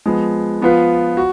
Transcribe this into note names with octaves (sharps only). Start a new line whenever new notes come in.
F3 G#3 B3
F3 B3 F4 B4
F#4